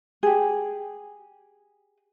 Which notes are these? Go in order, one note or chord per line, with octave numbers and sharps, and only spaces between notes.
G4 G#4